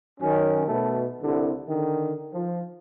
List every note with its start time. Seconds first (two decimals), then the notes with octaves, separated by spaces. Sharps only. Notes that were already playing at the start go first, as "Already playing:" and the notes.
0.21 F#2 D#3 C#4
0.67 B2 A3
1.23 C2 D3
1.69 D3 D#3
2.34 F3